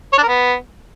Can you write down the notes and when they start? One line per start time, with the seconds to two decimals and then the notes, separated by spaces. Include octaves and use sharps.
0.13 C#5
0.18 D4
0.23 A#4
0.28 B3